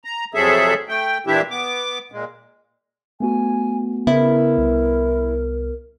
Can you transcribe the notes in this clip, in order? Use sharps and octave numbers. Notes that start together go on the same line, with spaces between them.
A#5
F2 C3 F#3 G#4 A4 E5
A3 G5
A#2 E3 D4 E4 G4 E5
B3 D6
A#2 G#3
A3 B3 F#4 G#5
C#3 B3 E4 A#4
C2